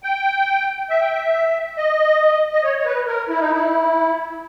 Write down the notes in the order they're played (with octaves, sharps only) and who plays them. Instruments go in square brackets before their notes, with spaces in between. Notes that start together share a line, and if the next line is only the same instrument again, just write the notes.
[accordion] G5
E5
G5
E5
D#5
D#5
C#5
C#5
B4
A#4
E4
D#4
E4